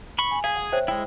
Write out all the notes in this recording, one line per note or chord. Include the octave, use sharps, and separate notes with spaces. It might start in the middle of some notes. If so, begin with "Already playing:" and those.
B5 C#6
G#5
G#4 F5 G#5 G#6
F#5
C5 C#5 E5 G5
G#3 E4 G5